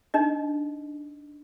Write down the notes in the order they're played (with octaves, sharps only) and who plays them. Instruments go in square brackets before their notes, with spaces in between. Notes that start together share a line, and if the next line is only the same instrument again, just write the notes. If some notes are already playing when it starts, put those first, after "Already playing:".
[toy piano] D4 D#4 D#5